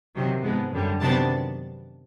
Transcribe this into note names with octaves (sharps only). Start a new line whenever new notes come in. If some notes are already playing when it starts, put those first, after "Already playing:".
C3 D#3 F#3
G#2 F3 G#3 B3
F#2 D3 G3
C3 D#3 F#3 B3 D4 A5